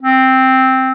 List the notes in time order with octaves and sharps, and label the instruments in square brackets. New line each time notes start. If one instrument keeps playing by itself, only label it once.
[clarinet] C4